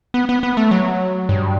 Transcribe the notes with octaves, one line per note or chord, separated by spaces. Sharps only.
B3
B3
B3
A3
F#3
G2